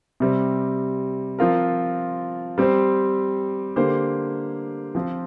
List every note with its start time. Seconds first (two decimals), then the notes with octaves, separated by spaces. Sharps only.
0.20 C3 G3 C4
1.39 F3 C4 F4 A#4
2.58 G3 C4 G4 C5
3.76 D3 A#3 G4 C5
4.95 F3 C4 F4